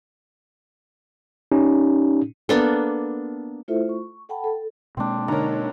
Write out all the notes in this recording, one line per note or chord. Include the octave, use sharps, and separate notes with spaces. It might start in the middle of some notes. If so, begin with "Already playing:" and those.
C#4 D#4 G4
A#3 B3 D4 A4
A3 E4 F4 A4 C5 E5
C#6
A4 F#5 G5 A5 B5
A4
B2 G#3 A#3 C4 D4
D3 D#4 A#4 C#5 A#5